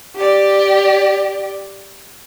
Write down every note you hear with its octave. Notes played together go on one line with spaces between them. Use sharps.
G4 D5